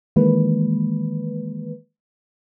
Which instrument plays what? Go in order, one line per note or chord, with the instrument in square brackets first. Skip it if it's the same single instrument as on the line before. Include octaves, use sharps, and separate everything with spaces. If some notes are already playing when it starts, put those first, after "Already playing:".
[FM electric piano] D#3 E3 G#3 A#3 B4